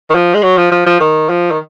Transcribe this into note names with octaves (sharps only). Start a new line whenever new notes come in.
D#3
F3
G#3
F#3
F3
F3
F3
D#3
F3
D#3